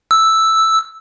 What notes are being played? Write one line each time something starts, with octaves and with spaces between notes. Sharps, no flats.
E6